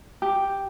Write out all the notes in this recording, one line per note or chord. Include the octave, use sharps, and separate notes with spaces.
G4